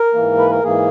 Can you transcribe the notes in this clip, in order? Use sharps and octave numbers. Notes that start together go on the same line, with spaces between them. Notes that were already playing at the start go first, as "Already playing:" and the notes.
Already playing: A#4
G#2 E3 A#3
B4
A#4
G#2 E3 A#3 G#4